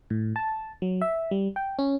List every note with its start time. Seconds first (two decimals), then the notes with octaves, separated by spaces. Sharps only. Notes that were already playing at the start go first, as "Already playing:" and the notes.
0.10 A2
0.36 A5
0.82 F#3
1.02 E5
1.31 G3
1.56 G5
1.79 C#4